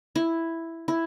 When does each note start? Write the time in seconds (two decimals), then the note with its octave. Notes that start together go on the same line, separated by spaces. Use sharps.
0.15 E4
0.88 E4